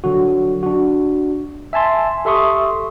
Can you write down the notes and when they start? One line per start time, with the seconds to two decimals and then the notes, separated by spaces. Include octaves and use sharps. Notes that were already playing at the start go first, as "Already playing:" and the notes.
0.04 D3 F#3 F#4
0.63 D4 F#4
1.73 E5 G#5 A5 C6
2.25 G4 A4 E5 C6 C#6 D#6